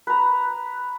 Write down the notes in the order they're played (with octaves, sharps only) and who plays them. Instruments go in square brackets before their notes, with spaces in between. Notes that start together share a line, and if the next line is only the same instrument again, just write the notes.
[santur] B4 A#5